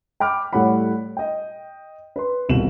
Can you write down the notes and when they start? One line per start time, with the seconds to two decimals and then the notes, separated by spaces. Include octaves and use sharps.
0.20 G5 B5 D6 F6
0.53 A2 G3 A3 C#5 F#5 B5
1.17 D#5 G5
2.16 B4 C6
2.49 D#1 C2 B2 E7 F#7